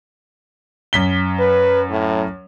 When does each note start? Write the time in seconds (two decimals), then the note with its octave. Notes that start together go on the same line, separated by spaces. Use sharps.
0.93 F#2 B6 G7
1.40 B4
1.91 A2